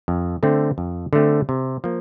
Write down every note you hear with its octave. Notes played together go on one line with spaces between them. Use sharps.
F2
D3 A3 C4
F2
D3 A3 C4
C3
F3 A#3